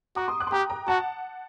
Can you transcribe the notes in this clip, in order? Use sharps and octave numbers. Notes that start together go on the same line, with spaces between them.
F#4 A#5 D6
C6 D#6
D6 F#6
C6
G4 G5 A#5
G5 A#5
F#4 F#5 A5